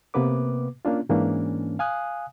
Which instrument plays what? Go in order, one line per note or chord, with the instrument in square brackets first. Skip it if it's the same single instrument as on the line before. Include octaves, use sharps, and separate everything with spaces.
[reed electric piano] C3 A#3 B3 B4 D6
A#3 C#4 D4 F4
G#2 E3 A#3 C#4 D4
F5 G#5 D#6 F#6